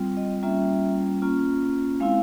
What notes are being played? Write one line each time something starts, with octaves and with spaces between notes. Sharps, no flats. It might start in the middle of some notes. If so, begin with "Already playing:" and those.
Already playing: G3 C4 F4
D#5
G3 A#3 C#4 F4 E5
A#3 C#4 F4
G#3 C4 E4 F5